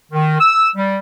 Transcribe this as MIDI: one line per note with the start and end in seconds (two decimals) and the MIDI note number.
0.12 0.34 51
0.39 0.67 88
0.75 0.97 55